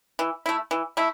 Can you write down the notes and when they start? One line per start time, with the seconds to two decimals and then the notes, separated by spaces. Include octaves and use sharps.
0.19 E3
0.46 A3 E4
0.71 E3
0.97 A3 E4